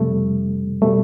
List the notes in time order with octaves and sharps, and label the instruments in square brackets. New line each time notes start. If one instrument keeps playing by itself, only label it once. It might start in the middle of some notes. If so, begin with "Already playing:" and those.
Already playing: [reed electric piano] F2 C3 G3 A3
B2 G3 A3